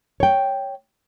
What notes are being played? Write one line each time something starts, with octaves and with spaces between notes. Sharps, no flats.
C#5 G5